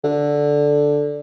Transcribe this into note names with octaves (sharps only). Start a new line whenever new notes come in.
D3